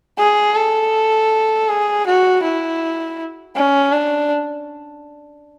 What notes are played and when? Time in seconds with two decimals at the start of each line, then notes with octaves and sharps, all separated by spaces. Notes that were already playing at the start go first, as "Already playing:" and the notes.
0.18 G#4
0.56 A4
1.69 G#4
2.06 F#4
2.43 E4
3.56 C#4
3.92 D4